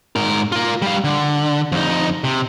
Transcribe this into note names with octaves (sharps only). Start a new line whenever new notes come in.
G#2 A#4
F4 A#4
G3 F5
D3
F2 D#4
C3